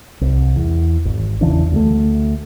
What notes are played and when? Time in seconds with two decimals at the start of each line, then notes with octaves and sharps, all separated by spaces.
0.21 C2
0.56 E2
1.05 G#1
1.41 E2 C#3 E3 D4
1.72 D2 G#3 A3